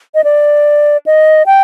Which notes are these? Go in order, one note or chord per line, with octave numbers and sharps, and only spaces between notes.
D#5
D5
D#5
G5